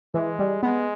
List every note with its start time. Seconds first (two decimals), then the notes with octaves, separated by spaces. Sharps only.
0.14 E3 G#3
0.39 G3
0.63 G#3 B3